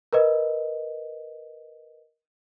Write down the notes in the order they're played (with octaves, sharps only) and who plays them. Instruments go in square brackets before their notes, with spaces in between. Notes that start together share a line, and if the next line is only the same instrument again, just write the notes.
[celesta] A#4 B4 D#5